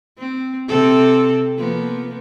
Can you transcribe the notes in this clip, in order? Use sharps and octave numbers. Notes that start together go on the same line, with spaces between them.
C4
C3 C4 A4
F3 A#3 B3